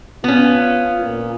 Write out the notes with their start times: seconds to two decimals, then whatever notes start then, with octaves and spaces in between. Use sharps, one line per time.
0.24 B3 C#4 F4
1.02 A#2